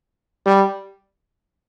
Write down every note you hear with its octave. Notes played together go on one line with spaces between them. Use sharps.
G3